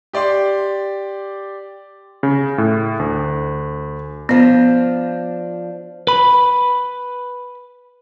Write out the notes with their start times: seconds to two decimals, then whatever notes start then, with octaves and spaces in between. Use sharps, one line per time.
0.13 G4 D5 G5 C6
2.23 C#3
2.58 A2
2.99 D2
4.29 F3 B3 D4
6.07 B4 B5